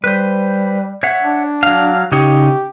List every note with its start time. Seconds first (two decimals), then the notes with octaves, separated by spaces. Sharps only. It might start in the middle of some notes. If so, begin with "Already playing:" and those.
0.04 G3 B4 C5
1.03 C#5 E5 F#5
1.23 D4
1.63 F#3 F5
2.12 C#3 D#4 G4 C#5